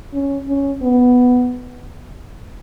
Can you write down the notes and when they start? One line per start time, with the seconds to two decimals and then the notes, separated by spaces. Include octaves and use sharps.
0.13 C#4
0.48 C#4
0.82 B3